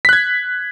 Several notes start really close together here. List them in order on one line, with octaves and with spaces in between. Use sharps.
B6 F#6 G#6